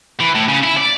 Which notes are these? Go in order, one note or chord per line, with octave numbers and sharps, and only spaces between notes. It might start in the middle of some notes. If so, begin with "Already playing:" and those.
E3
A2
C#3
E4
D5